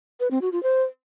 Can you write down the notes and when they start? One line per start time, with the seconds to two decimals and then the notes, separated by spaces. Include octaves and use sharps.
0.20 B4
0.31 C4
0.42 F#4
0.52 F4
0.63 C5